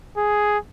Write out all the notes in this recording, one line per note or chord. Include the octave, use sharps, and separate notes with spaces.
G#4